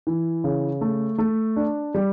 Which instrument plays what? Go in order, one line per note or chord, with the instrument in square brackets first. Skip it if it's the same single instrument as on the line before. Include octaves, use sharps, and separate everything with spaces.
[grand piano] E3
C#3
A3
A3
D4
G3